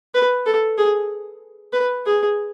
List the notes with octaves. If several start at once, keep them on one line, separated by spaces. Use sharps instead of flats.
B4
A4
G#4
B4
G#4